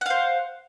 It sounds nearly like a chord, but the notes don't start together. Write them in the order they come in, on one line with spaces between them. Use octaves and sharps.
F#5 F5 C5